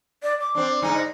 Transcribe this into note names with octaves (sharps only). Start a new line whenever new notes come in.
D5
D6
C4 D4
G#2 D3 D#4 G#5
D#5